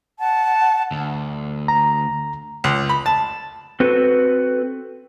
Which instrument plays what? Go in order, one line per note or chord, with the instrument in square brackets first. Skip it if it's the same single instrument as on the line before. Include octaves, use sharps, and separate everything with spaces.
[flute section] F#5 A5
[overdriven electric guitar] D2
[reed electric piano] A#5
[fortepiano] C#2
B5
A5
[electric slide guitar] C4 F#4 A4 B4